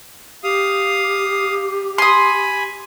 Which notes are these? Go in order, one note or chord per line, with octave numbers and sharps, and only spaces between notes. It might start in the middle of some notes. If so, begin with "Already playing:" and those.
G4 F5 D#6
G#5 B5 C6 D#6